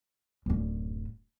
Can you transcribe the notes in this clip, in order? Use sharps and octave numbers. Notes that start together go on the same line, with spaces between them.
D1 F#2